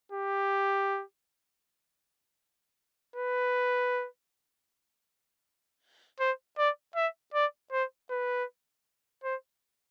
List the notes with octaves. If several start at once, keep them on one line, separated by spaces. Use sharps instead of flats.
G4
B4
C5
D5
E5
D5
C5
B4
C5